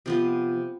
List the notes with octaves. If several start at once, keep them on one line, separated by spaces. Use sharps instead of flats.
C3 F3 B3